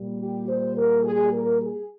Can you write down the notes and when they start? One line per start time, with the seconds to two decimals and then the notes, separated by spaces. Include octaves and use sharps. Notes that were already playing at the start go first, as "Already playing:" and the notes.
Already playing: A#2 G3
0.18 G4
0.47 C5
0.75 A#4
1.03 G#4
1.32 A#4
1.61 G#4